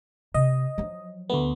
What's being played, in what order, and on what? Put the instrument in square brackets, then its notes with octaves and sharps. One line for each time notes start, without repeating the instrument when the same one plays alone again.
[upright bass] C3 [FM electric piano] D#5
[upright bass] F3 F#3
[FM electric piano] D2 A3 B3